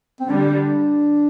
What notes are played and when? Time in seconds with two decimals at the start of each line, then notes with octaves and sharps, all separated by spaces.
0.21 C4
0.29 D3 G3 D4